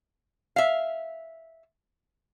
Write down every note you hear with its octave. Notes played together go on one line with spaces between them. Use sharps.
E5 F5